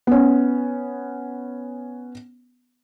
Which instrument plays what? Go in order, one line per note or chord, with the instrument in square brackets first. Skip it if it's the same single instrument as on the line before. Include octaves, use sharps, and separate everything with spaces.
[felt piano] B3 C#4